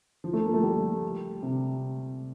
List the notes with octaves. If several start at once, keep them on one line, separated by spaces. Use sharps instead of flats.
F3
A3
A#3
A3
G3
C3